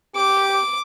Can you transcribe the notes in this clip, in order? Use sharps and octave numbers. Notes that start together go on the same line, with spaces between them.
G4 D6